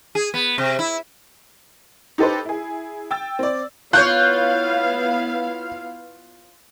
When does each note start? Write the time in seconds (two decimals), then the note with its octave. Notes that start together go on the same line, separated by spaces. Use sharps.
0.15 G#4
0.34 B3
0.58 C3
0.79 E4
2.18 D#4 G4 A4 B4 C5
2.45 E4 G#4
3.11 G5 E6 A6
3.39 C4 D5
3.93 B3 E4 F4 C#5 F5 F#6 G6